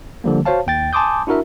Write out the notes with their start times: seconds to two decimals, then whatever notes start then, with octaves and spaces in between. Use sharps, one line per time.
0.24 D3 F3 G3 A#3
0.45 F#4 C5 C#5 F5 A5
0.67 D#2 G5 A6
0.93 G#5 A5 C6 D6 D#6 G6
1.27 D4 E4 F#4 A#4 E5